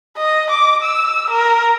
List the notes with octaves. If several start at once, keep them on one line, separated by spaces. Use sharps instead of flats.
D#5
D6
E6
A#4